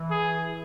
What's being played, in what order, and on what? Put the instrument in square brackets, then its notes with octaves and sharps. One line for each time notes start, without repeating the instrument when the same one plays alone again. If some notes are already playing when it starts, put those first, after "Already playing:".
Already playing: [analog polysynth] E3
[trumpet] G#4